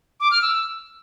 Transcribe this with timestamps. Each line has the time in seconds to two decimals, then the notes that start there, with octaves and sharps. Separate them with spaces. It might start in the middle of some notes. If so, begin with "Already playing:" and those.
0.20 D6
0.31 F6
0.42 E6